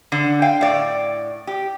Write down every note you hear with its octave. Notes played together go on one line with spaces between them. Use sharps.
D3
F5 G5
A2 D5
G4